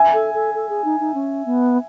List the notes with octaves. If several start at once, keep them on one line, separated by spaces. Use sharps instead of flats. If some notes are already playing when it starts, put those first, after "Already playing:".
Already playing: E5 G#5
A4
A4
A4
G#4
D#4
D#4
C#4
B3